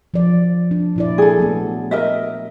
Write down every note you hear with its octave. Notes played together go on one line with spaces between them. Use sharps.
F3 D5
D4
A#2 E4 D5
G#4 A4
F#3 A3 B3
A#4 D#5 E5